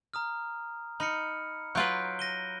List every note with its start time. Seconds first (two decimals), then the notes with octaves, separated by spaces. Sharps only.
0.13 A#5 D#6 F6
1.00 D#4 B5 F6 C#7
1.75 F#3 F4 B4 F#6 G6 D7
2.19 A#6 D#7 G7